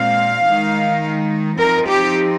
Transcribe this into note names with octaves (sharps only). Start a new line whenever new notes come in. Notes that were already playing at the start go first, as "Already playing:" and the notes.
Already playing: A#2 G#3 C4 F5
D#3 G#3 D#4
F3 C4 D#4 A#4
G4